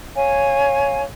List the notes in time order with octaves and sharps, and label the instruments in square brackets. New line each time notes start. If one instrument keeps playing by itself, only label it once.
[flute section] C#5 F5 G#5